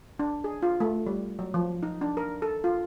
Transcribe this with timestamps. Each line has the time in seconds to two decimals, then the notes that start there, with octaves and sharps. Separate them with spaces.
0.19 D4
0.44 G#4
0.63 F4
0.80 A3
1.07 G3
1.39 F#3
1.54 F3
1.83 D#4
2.01 D4
2.17 A#4
2.42 A4
2.64 F4